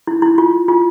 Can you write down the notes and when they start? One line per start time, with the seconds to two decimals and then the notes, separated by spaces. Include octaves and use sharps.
0.07 E4
0.22 E4
0.38 F4
0.68 F4